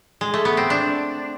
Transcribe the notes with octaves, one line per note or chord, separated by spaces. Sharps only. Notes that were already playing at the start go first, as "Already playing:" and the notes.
G#3
A3
B3
C4
D4